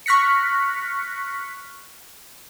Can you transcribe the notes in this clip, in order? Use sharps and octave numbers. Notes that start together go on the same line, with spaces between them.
C#6 F6 F#6 A#6 B6 C#7